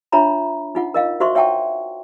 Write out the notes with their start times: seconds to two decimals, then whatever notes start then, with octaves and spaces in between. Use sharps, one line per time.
0.12 D4 F4 C#5 E5 A#5 B5
0.75 D#4 F4 F#5
0.94 A#4 D#5 F5
1.20 F#4 C5 E5 C6 C#6
1.35 C#5 E5 F#5 G5 A5 C#6